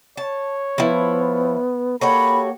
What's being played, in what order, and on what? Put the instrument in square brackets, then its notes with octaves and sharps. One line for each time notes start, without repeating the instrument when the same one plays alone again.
[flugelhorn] C#5 [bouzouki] A5
[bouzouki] F3 E4 [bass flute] B3
[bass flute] A#3 [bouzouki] F#4 G4 C#5 [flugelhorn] A4 [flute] B5